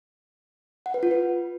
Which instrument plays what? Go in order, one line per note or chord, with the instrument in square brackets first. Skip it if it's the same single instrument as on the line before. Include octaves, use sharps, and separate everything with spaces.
[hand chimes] F#5
B4
F4
B4